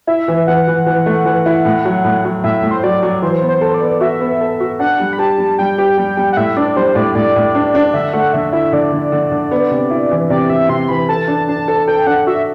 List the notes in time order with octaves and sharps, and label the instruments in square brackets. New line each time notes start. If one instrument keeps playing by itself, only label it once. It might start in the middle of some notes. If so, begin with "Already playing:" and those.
[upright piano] E4 [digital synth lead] E5
[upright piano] E3
[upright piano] E3 [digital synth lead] F#5
[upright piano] E3
E3
A3
E3
E4
A2
F#3
A2
F#3
[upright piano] A2 [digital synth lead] E5
[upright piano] A2
[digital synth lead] C5
[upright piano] F#3 [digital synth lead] D5
[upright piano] F#3
[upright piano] E3 [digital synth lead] C5
[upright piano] B3
[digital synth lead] C5
[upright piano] A4
[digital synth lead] D5
[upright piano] B3
[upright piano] F#4 [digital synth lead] E5
[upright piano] B3
A4
F#4
[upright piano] D4 [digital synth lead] F#5
[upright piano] G3
[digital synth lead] B5
[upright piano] G4 [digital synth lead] A5
[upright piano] G3
[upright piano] G3 [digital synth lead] G5
[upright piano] G4
G3
G3
[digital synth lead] F#5
[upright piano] A2 [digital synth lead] E5
[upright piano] D4 [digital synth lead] D5
[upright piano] G3 [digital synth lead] C5
[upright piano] A2 [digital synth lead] D5
[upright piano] A2 [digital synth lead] D5
[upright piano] A2
D4
D4
[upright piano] D3 [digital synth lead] E5
[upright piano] A3 [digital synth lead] F#5
[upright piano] D3 [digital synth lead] E5
[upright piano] E4 [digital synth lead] E5
[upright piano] D3 [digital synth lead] D5
[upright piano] D3
D3
D3
B3
C3
E4
E3
[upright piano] C3 [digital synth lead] D5
[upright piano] C3 [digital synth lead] E5
[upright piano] C3 [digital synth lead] C6
[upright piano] E3 [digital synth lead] B5
[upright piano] A4 [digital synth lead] A5
[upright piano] D4
[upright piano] D4 [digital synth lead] A5
[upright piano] A4
[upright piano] A4 [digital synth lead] G5
[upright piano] D4 [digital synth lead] F#5
[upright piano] F#4 [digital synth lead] E5